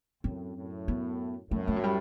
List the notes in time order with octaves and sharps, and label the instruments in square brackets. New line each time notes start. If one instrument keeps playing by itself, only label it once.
[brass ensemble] F#2 A2 [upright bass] C4
[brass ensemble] F#2 A2
[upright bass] B3
[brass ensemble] F#2 A2 [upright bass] A3
[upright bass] A3
F#3
G3